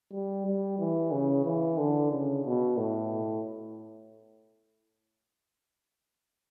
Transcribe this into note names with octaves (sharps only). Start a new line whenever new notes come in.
G3
G3
E3
C#3
E3
D3
C#3
B2
A2